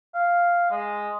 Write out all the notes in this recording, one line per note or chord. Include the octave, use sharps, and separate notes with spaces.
F5
G#3